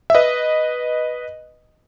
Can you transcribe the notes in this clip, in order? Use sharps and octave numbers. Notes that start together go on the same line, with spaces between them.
E5
B4 D#5